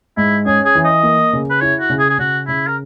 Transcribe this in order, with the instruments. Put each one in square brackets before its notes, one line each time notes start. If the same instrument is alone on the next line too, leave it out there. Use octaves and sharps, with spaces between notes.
[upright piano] G#2 [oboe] E4
[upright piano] C#4 [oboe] G#4
[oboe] G#4
[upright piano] E3
[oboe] D#5
[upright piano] A#3
C#3
[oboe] B4
[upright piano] E4 [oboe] C#5
[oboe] F#4
[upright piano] C#3
[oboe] G#4
G#4
[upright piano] C#3 [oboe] F#4
[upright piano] C#3 [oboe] E4
[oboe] A#4